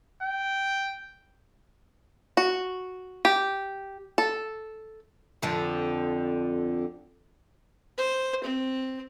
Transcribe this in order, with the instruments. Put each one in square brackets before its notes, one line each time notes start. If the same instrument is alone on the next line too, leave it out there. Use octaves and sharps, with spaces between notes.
[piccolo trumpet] G5
[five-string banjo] F#4
G4
A4
[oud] F2 D3 F3
[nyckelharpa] C5
C4